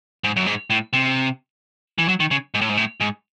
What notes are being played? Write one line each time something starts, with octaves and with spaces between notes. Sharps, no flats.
G#2
F#2
G#2
A2
C3
E3
F#3
D#3
C#3
G#2
A2
G#2
A2
G#2